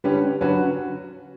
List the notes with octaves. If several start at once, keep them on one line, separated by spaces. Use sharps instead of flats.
D3 G3 C#4 G4 B4
D3 F#3 C#4 F#4 B4